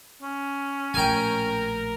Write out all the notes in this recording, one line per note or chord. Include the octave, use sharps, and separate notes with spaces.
C#4
A#1 A2 A#4 G5 G#5